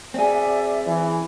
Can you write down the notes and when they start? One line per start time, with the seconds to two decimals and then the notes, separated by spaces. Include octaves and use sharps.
0.14 C4 G#4 D5 E5
0.87 E3